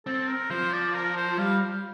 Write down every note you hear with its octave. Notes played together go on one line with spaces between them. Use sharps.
C4 A4
A#4
F3 C5
D5
A#4
C5
G3 F5